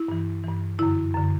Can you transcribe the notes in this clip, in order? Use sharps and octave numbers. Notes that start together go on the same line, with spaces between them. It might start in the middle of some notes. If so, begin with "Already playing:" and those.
Already playing: E4
G2 E3
G2 E3
F#2 D3 E4
F#2 D3